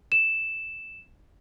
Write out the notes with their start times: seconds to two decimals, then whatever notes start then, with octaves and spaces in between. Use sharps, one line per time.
0.12 E7